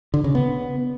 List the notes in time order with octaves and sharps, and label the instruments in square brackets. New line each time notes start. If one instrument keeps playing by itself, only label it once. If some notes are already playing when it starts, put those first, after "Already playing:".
[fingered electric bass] D3
C#3
B3